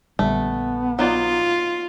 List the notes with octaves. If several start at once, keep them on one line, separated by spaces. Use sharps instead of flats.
A#1 D3 G3 A3 B3
F#3 D#4 F4 D5